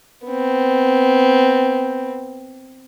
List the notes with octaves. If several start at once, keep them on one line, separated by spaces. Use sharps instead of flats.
B3 C4